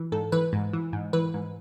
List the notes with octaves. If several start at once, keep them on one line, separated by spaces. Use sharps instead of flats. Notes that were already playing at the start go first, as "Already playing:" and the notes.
Already playing: E3
G#2 A4
E3 B4
G#2
E3
G#2
E3 B4
G#2